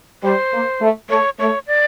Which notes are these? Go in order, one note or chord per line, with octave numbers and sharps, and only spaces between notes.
G3 C5
A#3
A3
A3 C#5
A3 C#5
D5